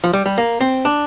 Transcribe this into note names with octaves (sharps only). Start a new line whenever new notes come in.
F3
G3
G3
A#3
C4
D4